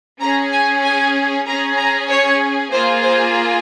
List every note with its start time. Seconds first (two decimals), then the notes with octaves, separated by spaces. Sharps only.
0.21 C#4 G#4 A#5
0.53 G#5
0.83 G#5
1.46 C#4 G#4 A#5
1.78 A#5
2.10 C#5
2.71 A#3 F4 G#4 C5
3.03 C5